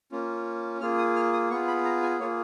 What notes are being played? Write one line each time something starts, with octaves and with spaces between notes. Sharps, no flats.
A#3 C#4 F4
A#3 F4 G#4 F6
D#6
F6
D#6
B3 F4 G#4 C#6
B5
A#5
G#5
A#3 F4 G#4 C#5